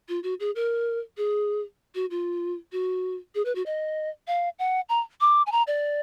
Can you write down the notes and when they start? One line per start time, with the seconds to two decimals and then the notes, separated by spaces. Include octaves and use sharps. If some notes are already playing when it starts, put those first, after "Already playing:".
0.09 F4
0.23 F#4
0.40 G#4
0.56 A#4
1.17 G#4
1.95 F#4
2.11 F4
2.72 F#4
3.35 G#4
3.45 B4
3.55 F#4
3.66 D#5
4.27 F5
4.59 F#5
4.89 A#5
5.21 D6
5.47 G#5
5.52 A#5
5.67 D5